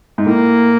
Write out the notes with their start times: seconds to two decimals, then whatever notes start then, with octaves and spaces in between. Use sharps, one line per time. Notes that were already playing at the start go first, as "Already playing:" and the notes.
0.18 G#2
0.27 A2 A#3